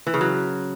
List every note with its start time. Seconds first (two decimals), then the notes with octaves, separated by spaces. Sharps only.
0.07 E3
0.14 C#3
0.21 F#3